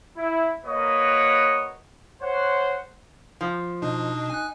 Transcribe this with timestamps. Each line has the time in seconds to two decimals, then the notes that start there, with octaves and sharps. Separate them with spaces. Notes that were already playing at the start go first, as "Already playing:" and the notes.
0.17 E4
0.65 A#3 F#4 A#4 B4 C#5 D#5
2.22 C5 C#5 F#5
3.41 F3
3.82 B2 D4 D#4
4.30 G#5 F#6